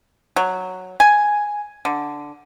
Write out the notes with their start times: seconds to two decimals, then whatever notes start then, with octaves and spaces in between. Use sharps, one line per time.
0.36 F#3
1.00 G#5
1.85 D3